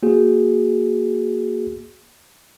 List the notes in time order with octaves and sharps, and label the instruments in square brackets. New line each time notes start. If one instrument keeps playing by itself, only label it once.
[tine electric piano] A#3 F#4 G#4